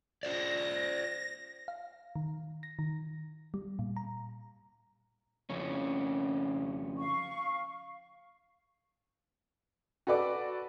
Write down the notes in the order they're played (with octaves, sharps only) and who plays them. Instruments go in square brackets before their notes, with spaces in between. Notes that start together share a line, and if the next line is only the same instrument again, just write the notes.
[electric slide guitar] F4 C5 D5 [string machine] A#6
[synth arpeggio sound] F5
D#3
A#6
D#3
G3
A#2
A#5
[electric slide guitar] F2 C#3 C#4
[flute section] F5 C#6
[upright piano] F#4 A4 B4 D5 D6